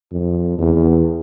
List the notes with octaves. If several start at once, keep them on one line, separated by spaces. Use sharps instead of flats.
F2
E2